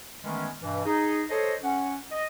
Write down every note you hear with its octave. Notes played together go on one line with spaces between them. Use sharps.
D#3 E3 G#3 A3 B3 C#4
G2 B2 E3
D#4 G#4
A4 C5 C#5 D#5
C#4 F#5
D#5